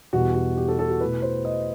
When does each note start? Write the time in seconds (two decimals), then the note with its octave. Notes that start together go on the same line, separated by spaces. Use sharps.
0.13 E2 B2 G3 F#4
0.35 F#4
0.57 G4
0.68 A4
0.79 A4
0.90 F#4
1.01 B2 A3 E4 B4
1.22 C5
1.45 D#5